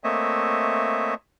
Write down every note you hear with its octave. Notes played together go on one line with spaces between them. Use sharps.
A3 A#3 C4 C#5 D#5 E5